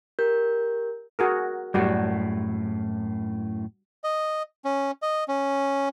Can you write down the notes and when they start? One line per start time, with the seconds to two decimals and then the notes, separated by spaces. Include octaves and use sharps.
0.19 G4 A#4 G6
1.19 F#4 G#4 A#4
1.74 F#2 A2 G3 F#4
4.04 D#5
4.65 C#4
5.02 D#5
5.28 C#4